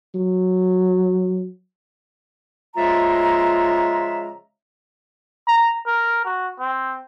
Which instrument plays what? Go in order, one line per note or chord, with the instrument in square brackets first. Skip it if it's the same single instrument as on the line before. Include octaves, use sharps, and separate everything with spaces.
[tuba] F#3
[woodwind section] C#3 F3 G#3 F4 E5 A#5
[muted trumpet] A#5
A#4
F#4
C4